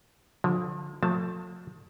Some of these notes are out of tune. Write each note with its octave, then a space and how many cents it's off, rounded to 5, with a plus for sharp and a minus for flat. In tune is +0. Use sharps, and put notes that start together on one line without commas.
D3 +0 F3 +35
F3 +45 A3 +30 A5 +0